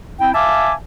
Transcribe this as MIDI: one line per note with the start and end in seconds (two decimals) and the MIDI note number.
0.20 0.31 60
0.20 0.31 64
0.20 0.31 79
0.34 0.73 76
0.34 0.73 77
0.34 0.73 80
0.34 0.73 81
0.34 0.73 86